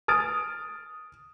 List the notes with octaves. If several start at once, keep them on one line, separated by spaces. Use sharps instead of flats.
D#6 F6 A6 D7